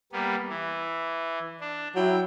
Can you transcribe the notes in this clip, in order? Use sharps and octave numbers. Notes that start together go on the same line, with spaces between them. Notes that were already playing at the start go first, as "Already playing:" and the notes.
G3 A#3 B3
E3
D4
F#3 E4 G5